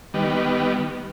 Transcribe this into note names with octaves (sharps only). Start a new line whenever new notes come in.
D#3 G3 B3